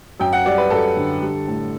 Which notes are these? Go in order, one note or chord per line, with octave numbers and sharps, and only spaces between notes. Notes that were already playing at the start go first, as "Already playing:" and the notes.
F#2 G5
F#5
G3 D5
B4
F#2 A4
D3
G3
A2